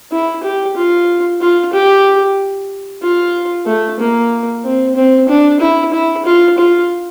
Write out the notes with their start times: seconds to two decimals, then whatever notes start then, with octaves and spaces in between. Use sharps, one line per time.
0.12 E4
0.44 G4
0.77 F4
1.42 F4
1.73 G4
3.02 F4
3.67 A3
4.00 A#3
4.65 C4
4.96 C4
5.29 D4
5.61 E4
5.94 E4
6.26 F4
6.59 F4